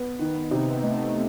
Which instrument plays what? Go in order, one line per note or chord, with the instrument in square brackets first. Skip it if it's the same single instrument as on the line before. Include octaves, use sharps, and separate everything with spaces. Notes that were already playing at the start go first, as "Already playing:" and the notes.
Already playing: [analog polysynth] B3 [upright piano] B4
[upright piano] D#3
[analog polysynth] D#4
[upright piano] C3
[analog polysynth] C4
B3
[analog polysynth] A3 [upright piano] D#4